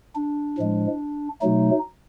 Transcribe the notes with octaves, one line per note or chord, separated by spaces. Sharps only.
D4
A2 F3 G#3
B2 F#3 A3 D#4